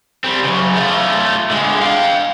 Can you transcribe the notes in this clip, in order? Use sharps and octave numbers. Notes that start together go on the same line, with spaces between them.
G3 C4
F#2 C#3
A3 F4
D3 G#3
F5 G5